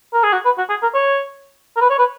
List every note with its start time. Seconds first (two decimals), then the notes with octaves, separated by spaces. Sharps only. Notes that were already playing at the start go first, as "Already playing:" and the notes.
0.13 A#4
0.23 G#4
0.33 F#4
0.45 B4
0.58 F#4
0.69 G#4
0.82 A#4
0.94 C#5
1.76 A#4
1.81 B4
1.90 C#5
1.99 B4